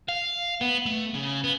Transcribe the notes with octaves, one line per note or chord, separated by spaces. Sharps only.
F5
B3
A3
C#3
B3